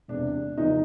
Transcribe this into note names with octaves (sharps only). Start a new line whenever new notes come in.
E1 E2 C3 D4
E2 C#3 F3 D#4